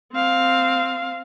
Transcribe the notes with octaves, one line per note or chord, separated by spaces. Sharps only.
C4 F5